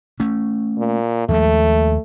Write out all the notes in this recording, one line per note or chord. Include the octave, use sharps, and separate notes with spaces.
A3 C#4
A#2
D#2 F3 G#3 A3